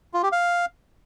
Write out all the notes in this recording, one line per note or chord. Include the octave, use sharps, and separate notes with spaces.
F4
G4
F5